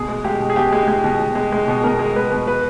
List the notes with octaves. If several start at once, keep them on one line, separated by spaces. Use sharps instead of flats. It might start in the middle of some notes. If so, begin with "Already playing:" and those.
Already playing: B2 G#4
G#3
G#3 G4
B2
G#4
B2 G4
G#3
G#3
B2
B2
G#3
G#3
B2
B2 A#4
G#3
G#3 B4
B2
B4